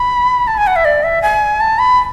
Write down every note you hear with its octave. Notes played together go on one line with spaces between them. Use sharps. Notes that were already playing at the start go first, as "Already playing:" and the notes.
Already playing: B5
A5
G#5
F#5
E5
D5
E5
G#5
A5
B5